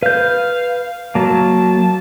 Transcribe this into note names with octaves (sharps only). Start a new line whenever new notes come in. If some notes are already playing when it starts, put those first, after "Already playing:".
B4 F5 G6
F#3 A#3 A5